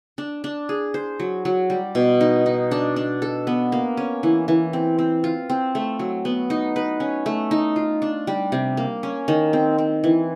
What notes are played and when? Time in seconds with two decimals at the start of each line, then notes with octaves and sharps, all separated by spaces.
0.18 D4
0.44 D4
0.69 G#4
0.94 C5
1.20 F#3
1.45 F#3
1.70 G3
1.95 B2
2.21 D#4
2.46 D#4
2.71 D4
2.96 D4
3.22 A4
3.47 B3
3.72 A#3
3.97 C#4
4.23 E3
4.48 E3
4.73 C4
4.99 C4
5.24 F4
5.50 C4
5.75 A3
5.99 F#3
6.25 B3
6.50 D#4
6.76 B4
7.00 C#4
7.26 A3
7.51 D#4
7.76 F4
8.02 D4
8.27 G3
8.52 C3
8.77 A#3
9.03 C#4
9.28 D#3
9.53 C4
9.78 C4
10.04 E3